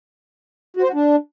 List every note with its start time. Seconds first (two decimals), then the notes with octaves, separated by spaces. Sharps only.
0.77 F#4
0.82 C5
0.88 F#4
0.94 D4